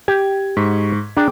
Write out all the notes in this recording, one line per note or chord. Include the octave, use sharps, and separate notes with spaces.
G4 G#6
G#2 C#6 B6
D4 G#4 G5 A#5 D6